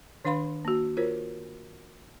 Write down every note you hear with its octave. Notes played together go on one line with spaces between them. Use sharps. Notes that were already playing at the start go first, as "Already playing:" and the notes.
D#3 D4 B4 F5 B5 C6
A#3 F#4
F4 A#4 C5 C#5